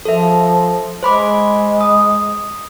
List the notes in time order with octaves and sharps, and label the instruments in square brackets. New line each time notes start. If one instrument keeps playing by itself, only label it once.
[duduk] F3 [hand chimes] A4 E5
[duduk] G#3 [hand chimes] C5 B5 D6
[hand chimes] D#6